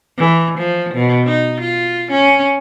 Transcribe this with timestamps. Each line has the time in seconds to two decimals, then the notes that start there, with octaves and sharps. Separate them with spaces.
0.18 E3
0.58 F3
0.94 B2
1.26 D#4
1.61 F4
2.12 C#4